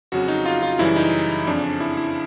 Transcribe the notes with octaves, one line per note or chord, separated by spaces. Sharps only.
F2 C#3 F#3 F#4
D#4
F4
F4
F#2 C#3 E3 G3 E4
D#4
F2 C#3 F3 D4
D4
E4
E4